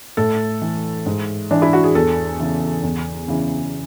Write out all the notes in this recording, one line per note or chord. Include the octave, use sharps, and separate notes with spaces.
A2 A4
E3
G#2
E3 D4
E4
F#4
G#4
E2 A4
C#3 E3
E2
C#3 E3